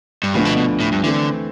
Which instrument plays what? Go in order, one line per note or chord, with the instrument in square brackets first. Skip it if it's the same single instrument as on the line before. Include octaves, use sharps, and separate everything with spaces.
[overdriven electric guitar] G2
[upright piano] D2 D3 F3 B3 D4 [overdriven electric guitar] A2
[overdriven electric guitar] B2
B2
A2
G2
[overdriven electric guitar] D3 [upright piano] E3 A3 C4